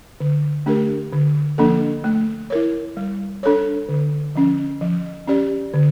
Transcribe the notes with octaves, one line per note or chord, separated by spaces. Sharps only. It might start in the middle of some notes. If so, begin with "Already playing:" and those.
D3
A3 D4 G4 A#4
D3
F3 A#3 D4 A4
A3
E4 A#4 C#5
G3
D4 A4 C#5
D3
F3 C#4
F3
C#4 G4 D5
D3